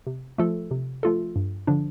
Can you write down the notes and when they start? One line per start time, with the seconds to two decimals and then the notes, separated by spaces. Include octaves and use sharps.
0.07 C3
0.38 F3 A3 F4 A4
0.71 C3
1.03 F3 A3 F4 A4
1.36 G2
1.67 D3 F3 D4